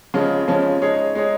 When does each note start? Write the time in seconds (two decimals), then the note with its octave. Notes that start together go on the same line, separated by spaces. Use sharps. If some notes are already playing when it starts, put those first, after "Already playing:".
0.14 C#3 F3 G#3 C#4
0.48 C#3 F3 G#3 C#4
0.82 G#3 D#4 G#4 C#5
1.15 G#3 D#4 G#4 C#5